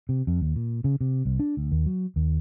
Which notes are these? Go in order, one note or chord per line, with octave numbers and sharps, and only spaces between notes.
C3
F2
D#2
A#2
C#3
C3
C2
D4
D2
D#2
F#3
D#2